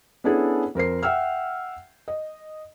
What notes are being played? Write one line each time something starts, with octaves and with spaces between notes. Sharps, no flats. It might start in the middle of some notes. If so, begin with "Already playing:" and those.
B3 C#4 D4 E4 G#4 A4
F2 A#4 C5 C7
E5 F#5 G5 E6 F6
D#5